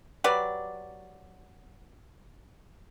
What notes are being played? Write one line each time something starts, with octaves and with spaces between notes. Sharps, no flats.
F#3 G4 B4 D5